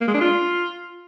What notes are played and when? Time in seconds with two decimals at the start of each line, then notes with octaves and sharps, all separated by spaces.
0.01 A#3
0.08 G#3
0.14 D4
0.21 F4